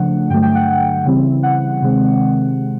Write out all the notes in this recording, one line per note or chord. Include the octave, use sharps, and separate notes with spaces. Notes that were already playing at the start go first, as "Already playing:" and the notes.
Already playing: C#3 F3 A3 D4 F#5
G2 D3 F#3 A3 G5
G5
F#5
C#3 E3 G3 C4 E4
F#5
C3 D#3 G#3 C4